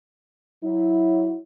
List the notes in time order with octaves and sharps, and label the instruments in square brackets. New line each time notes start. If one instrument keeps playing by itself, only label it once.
[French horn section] F#3 E4